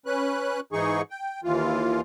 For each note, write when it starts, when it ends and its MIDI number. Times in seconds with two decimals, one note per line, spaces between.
0.06 0.60 61
0.06 0.60 71
0.06 0.60 90
0.72 1.02 44
0.72 1.02 52
0.72 1.02 63
0.72 1.02 68
0.72 1.02 85
1.10 1.41 79
1.44 2.01 39
1.44 2.01 52
1.44 2.01 65